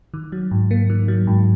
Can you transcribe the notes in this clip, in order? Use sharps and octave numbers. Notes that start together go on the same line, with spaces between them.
D#3
F#3
G#2
A#3
D#3
F#3
G#2